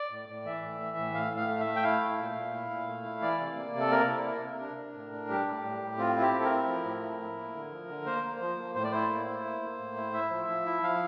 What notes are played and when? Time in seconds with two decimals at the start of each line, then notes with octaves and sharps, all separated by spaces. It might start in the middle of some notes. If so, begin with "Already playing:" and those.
Already playing: D5
0.11 A2
0.29 A2
0.45 E3 E5
0.63 A2
0.81 E3
0.97 A2
1.14 A2 F5
1.32 A2 F5
1.49 A3
1.60 E5
1.66 A3
1.76 G5
1.83 E4 F5
2.01 A3
2.19 A#2
2.35 A#2
2.53 E4
2.70 A#2
2.87 A3
3.04 E4
3.21 E3 D5
3.39 C3
3.57 A#3
3.74 C3
3.80 A4
3.91 A#3 A#4
4.08 E4
4.26 A#3
4.42 C3
4.60 D4
4.77 D4
4.94 A2
5.12 D4
5.30 G3 G4
5.46 A2
5.63 A2
5.82 A2
5.98 C4 F4
6.16 E4
6.22 G4
6.33 C4
6.39 A4
6.45 A#4
6.50 E4
6.67 F3
6.84 A2
7.02 E4
7.19 E4
7.37 A#3
7.55 D3
7.72 F3
7.89 D3
8.06 A#3 C5
8.24 A#3
8.41 F3
8.58 A#3
8.75 A2 C5
8.84 D5
8.92 E4 C5
9.09 A#3
9.27 E4
9.45 A#3
9.62 A#3
9.78 A2
9.96 E4
10.13 E4 E5
10.31 F3
10.49 F3
10.66 E4
10.82 F3 F5